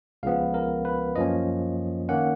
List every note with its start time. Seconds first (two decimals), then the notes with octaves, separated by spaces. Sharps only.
0.23 C#2 C#3 F3 B3 F5
0.54 A#4
0.85 B4
1.16 F#2 F3 A#3 C#4 D#5
2.09 D#3 A#3 C#4 F#5